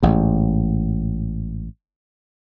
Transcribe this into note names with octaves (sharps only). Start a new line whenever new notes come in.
A1 G#2